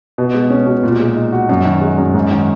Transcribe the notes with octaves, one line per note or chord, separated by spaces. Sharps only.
B2
G#3
C#4
B2
A#2
G#3
D#4
F#4
F#2
D#3
G#3
F#2
G#2
D#3